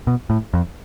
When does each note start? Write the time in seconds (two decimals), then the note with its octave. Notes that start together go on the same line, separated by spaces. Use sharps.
0.07 B2
0.30 A2
0.54 F2